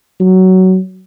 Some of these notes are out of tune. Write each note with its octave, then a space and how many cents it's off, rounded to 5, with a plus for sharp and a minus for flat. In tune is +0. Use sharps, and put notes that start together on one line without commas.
F#3 +15